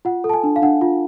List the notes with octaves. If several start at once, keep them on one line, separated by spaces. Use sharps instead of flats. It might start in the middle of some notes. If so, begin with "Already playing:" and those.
F4 F#5
A4
A5
G#5
D4
F5
D4 F#5
F4